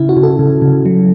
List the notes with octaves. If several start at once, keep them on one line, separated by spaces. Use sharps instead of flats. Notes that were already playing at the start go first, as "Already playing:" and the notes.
Already playing: C#3 E4
F#4
C#3
A4
C#3
C#3
F#3